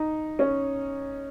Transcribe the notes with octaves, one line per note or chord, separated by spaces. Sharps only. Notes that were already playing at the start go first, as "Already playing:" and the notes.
Already playing: D#4
C#4